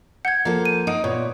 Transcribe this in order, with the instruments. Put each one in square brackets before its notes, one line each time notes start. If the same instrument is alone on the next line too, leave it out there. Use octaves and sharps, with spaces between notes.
[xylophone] F#5 G#6 [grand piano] G6
[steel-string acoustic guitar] F3 A4 [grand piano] A#3
[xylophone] D#7
[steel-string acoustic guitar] D#4 [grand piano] F#5 D#6 D7
[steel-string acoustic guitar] A#2 [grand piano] B3 C#5